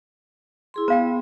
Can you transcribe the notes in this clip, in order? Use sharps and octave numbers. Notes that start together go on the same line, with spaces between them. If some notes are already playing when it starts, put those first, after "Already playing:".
E4 G#4 C6
B3 C5 F5 G5